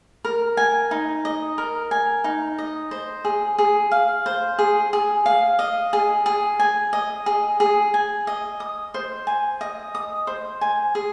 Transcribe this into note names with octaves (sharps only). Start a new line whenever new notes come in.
A#4
G#5
D#4
D#5
A#4
G#5
D#4
D#5
C5
G#4
G#4
F5
C5
G#4
G#4
F5
D#5
G#4
G#4
G#5
D#5
G#4
G#4
G#5
D#5
D#6
C5
G#5
D#5
D#6
C5
G#5
G#4